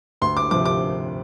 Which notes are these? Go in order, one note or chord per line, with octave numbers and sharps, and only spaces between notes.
D2 C6
D6
C3 F3 D6
D6